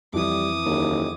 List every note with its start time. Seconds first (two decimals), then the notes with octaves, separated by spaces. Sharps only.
0.13 F2 E3 G3 D6 D#6
0.66 F#1 D#2